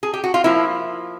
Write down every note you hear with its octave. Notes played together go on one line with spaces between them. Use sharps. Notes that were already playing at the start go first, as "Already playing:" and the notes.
G#4
G4
F#4
F4
F3 A#3 E4